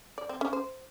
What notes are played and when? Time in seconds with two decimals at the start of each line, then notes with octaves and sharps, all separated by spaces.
0.18 D5
0.29 C4
0.41 C#4
0.53 C5